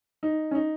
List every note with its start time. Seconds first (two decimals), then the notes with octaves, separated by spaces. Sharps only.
0.23 D#4
0.51 C#4
0.55 D#4